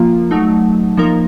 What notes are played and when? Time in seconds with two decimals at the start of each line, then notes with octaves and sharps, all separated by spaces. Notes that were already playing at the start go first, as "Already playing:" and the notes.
Already playing: F3 A#3 F4
0.31 F#3 A3 D#4
0.97 F3 A#3 D#4 A#4